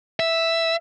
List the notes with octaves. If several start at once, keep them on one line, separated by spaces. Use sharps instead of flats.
E5